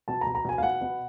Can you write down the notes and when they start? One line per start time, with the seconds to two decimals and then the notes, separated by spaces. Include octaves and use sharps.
0.08 B2 A5
0.21 A#5
0.26 B2
0.35 A#5
0.45 B2 G#5
0.58 F5
0.63 B2 F#5
0.81 B2